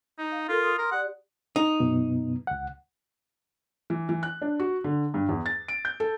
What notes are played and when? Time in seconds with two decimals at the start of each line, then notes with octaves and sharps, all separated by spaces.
0.18 D#4
0.32 F5
0.49 F4 A4 A#4 C6
0.62 C6 D#6
0.79 A#4
0.92 G4 D5 F#5
1.56 D#4
1.80 F#2 B2 B3
2.47 C#2 F#5
3.90 E3
4.09 E3
4.23 F#6
4.41 D4
4.60 F#4
4.84 D3
5.14 G2
5.29 E2
5.46 A6
5.68 D7
5.85 G6
6.00 A4